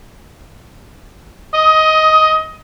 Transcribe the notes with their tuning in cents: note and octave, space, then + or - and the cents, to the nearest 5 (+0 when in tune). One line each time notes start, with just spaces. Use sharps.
D#5 +15 D#6 +30